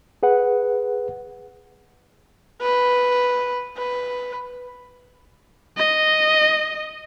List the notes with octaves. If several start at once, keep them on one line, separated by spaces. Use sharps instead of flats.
G#4 B4 F#5
B4
B4
D#5